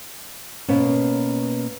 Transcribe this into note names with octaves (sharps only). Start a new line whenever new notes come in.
B2 A#3 B3 C#4